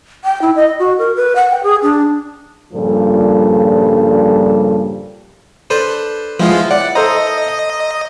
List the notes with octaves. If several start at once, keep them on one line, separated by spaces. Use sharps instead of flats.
G5
E4
D#5
F#4
A#4
B4
F#5
G5
G#4
D4
G2 A#2 C#3 F3 G3 A4
D4 A4 B4 C5
F3 G#3 B3 E4 F4
D5 F#5
A4 C5 D#5 A#5